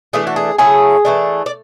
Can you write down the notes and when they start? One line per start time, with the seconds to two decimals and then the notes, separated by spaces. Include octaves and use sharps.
0.13 E3 A3 D4 G#4
0.27 F#4
0.36 G#4
0.58 C#3 F#3 A3 E4 G#4
1.05 E3 A3 D4
1.46 D5